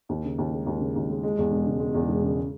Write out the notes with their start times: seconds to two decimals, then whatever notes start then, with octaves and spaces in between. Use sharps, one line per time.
0.09 D#2
0.25 C#3
0.38 D#2
0.52 G#3
0.67 D#2
0.81 C#3
0.96 D#2
1.10 G#3
1.23 G#3
1.38 E2
1.52 E1
1.66 C#3
1.80 G#3
1.94 E2
2.09 E1
2.23 C#3